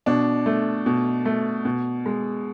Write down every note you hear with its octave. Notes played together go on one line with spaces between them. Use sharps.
B2 D4
A3
B2
A3
B2
G#3